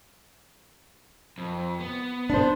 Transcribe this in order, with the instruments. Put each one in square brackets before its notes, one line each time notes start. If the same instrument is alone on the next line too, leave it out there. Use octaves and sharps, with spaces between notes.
[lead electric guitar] F2
B3
[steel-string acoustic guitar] D4 C5